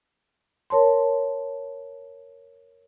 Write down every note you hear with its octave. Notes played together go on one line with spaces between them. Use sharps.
A#4 C#5 A5 C6